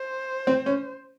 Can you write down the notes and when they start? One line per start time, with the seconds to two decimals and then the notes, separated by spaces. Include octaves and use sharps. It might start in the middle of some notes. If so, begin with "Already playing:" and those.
Already playing: C5
0.47 C4
0.66 C#4